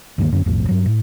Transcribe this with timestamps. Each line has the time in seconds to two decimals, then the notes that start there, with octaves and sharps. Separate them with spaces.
0.18 D2 G2 D#3 A#3
0.32 F#2 D3 C#4
0.46 E1 B1 F2 A2
0.69 G2 F#3
0.86 A2